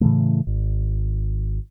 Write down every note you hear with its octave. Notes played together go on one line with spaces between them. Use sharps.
A2 C#3 E3 A3
G#1